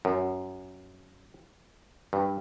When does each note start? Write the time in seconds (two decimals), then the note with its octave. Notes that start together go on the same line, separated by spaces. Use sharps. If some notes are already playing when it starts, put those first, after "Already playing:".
0.05 F#2
2.13 G2